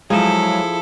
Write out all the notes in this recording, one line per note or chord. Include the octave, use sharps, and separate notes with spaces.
F3 F#3 G#3 E4 F4 G#4 A4